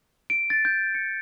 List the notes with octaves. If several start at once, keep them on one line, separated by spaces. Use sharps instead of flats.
D7
A6
G6
C#7